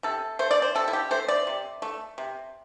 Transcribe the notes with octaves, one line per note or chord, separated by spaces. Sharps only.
C3 A4
A3 C5
D5
C5
C3 A4
E4
G4
A3 C5
D5
C3
A3
C3